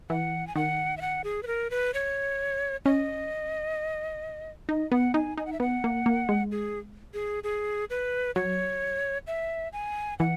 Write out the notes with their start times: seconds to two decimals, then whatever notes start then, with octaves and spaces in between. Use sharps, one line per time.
0.10 E3 F#5
0.47 G#5
0.56 D#3 F#5
0.97 E5
1.01 F#5
1.24 G#4
1.43 B4
1.47 A#4
1.71 B4
1.94 C#5
2.86 C#4 D#5
4.69 D#4 D#5
4.91 B3 F#5
5.14 D#4 G#5
5.38 D#4 G#5
5.46 F#5
5.53 E5
5.60 B3 F#5
5.84 A#3
6.06 A#3
6.29 G#3
6.52 G#4
7.14 G#4
7.44 G#4
7.90 B4
8.36 F#3 C#5
9.27 E5
9.73 G#5
10.19 E3 F#5